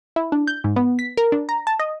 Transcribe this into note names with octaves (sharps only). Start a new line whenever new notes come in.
E4
D4
G6
G#2
B3
B6
A#4
D4
A#5
A5
D#5